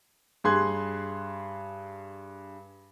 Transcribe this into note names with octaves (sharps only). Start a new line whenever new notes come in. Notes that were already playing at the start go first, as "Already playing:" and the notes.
G2 G#4 C6 F#6 G#6